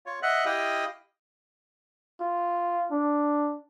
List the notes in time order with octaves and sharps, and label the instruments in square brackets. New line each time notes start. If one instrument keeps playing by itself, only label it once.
[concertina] F4 C#5
D#5 E5 F#5 F#6
E4 G4 D#5 F5 D#6
[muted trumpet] F4
D4